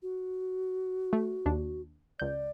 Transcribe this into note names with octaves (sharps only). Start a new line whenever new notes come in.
F#4
A3
D#2 D4
C#2 D5 G6